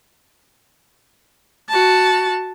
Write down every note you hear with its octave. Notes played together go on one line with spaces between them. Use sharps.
F#4 A5